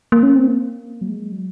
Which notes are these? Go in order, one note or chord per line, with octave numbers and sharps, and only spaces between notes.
A#3
C#4
C4
A#3
F#3
G#3
F#3